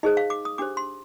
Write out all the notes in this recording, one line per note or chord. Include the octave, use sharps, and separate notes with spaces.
D#4 G#4 C5 D#5
F5
D6
D#6
D4 G4 C5 D6
C6